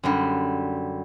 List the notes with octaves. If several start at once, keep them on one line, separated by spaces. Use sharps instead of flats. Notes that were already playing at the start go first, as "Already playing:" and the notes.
F#2 D3 G3